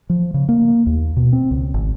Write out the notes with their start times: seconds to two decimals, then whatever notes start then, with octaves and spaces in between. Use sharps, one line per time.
0.10 F3
0.34 C#3
0.49 A#3
0.86 D#2
1.17 B2
1.33 C4
1.51 C#2
1.74 G#1